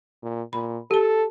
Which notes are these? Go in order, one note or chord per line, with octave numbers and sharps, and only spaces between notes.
A#2
A#2 B5
G4 A4 A5